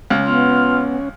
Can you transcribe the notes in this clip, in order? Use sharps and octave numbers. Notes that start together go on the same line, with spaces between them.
C#2 C#4
B3 F4